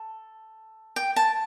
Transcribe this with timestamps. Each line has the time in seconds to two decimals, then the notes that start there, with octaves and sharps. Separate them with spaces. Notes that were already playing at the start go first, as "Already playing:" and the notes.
Already playing: A4
0.96 G5
1.16 A5